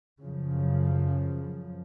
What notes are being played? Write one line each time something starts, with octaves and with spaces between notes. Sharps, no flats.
F#2 C#3 F3